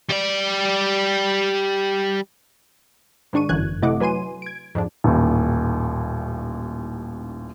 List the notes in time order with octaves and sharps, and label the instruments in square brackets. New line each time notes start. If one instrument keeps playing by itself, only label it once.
[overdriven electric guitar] G3 D5
[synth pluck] G#2 D#3 D4 C#6 D#7
G1 F#2 D3 E3 F#6 G#6
C3 A3 E4 D#5 F#5 D6
F#3 B4 G#5 C6 D#7
G#6 D7
F2 G#2 D4
[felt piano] D#1 A1 D#2